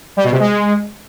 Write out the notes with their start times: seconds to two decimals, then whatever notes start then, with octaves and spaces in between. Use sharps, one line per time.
0.17 G3
0.24 B2
0.32 C3
0.40 G#3